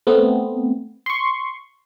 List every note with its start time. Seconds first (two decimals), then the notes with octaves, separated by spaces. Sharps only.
0.07 A3 B3 C4
1.06 C6 C#6